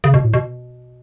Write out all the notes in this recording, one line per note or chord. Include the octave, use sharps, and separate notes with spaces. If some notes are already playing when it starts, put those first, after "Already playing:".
C#3
B2
A2
B2